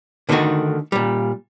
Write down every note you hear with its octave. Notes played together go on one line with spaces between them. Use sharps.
D3 D#3 A3 C4 D#4 F#4
A#2 G3